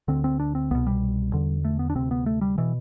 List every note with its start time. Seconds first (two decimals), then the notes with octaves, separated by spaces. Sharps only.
0.08 D2 D3 C4
0.24 C4
0.40 D4
0.55 C4
0.71 C2 B2 B3
0.87 G3
1.33 E2 D3
1.65 A3
1.79 B3
1.90 D4
1.95 D2 C3 C4
2.11 B3
2.26 A3
2.41 G3
2.58 B2 E3